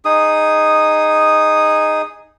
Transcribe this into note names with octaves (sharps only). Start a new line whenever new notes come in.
D#4 G#4 D#6